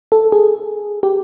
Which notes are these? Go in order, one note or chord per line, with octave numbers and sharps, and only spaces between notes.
A4
G#4
G4